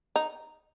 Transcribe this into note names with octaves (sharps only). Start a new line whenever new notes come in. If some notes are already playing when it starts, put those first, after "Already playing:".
D#4